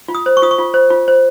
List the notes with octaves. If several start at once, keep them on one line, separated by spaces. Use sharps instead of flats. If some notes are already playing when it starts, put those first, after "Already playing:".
F4
D#6
C5
C#6
F4 D#6
C#6
F4
C5
F4
C5